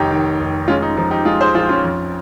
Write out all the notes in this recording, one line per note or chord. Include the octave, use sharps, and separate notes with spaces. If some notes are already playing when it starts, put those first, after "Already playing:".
Already playing: F1 D#3 D#4 G4 C#5
D#3
F1
G#3 C#4 F4
D#4
F3 D#4
D#4 G4
G#3 F4 G#4
G#4 C5
A#1 F4 G#4
C#4 F4
F2